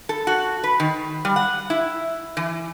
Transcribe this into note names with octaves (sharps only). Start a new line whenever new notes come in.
A4
F#4
B4
D#3
G3
F#5
E4
E3